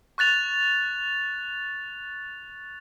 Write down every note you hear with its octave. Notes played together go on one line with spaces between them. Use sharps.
C#6 F#6 A6 F7